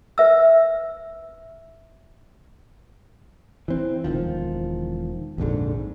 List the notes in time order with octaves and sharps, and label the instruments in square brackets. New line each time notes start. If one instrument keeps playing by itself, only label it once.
[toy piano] B4 E5 E6
[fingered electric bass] E3 C4
E1 C#2 D#3 F3
A#1 F2 G#2 D3